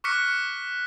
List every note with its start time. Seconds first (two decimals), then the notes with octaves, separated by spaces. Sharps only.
0.04 C#6 D6 F6 F#6 B6 C#7